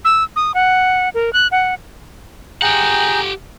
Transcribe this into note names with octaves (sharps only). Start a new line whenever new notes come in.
E6
D#6
F#5
A#4
F#6
F#5
G4 G#4 F#5 G5 A#5